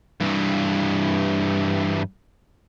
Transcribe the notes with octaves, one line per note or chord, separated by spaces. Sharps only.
G2 E3